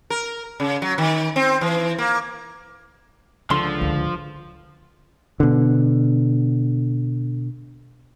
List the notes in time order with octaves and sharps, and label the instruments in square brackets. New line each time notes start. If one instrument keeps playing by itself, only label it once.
[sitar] A#4
C#3
F#3
D#3
C4
E3
A#3
[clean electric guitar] C#2 C6 [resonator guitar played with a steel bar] D3 [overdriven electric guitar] F3
[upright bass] D2 G#2
[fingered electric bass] B2 D3